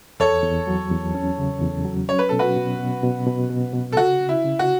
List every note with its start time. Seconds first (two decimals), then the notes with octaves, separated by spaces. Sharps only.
0.20 E2 A4 C#5
0.43 E2
0.67 F#3
0.91 E2
1.15 C#4
1.38 C#3
1.61 E2
1.85 F#3
2.08 C#4 C#5
2.19 B4
2.29 B2 A4
2.39 F#4 B4
2.56 B2
2.79 B2
3.03 B2
3.26 B2
3.50 B2
3.73 B2
3.92 A4
3.97 C#3 F#4
4.21 C#3
4.29 E4
4.44 C#3
4.59 F#4